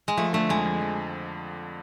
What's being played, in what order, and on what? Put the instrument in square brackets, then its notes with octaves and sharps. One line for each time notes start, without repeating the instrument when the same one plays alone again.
[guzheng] G#3
[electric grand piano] F3 [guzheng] A3
[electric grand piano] D3 [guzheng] A3
[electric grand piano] F2 [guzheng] G#3
[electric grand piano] F2
F3